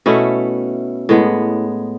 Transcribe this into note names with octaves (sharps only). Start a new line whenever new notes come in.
B2 A3 C#4 E4
A2 G#3 B3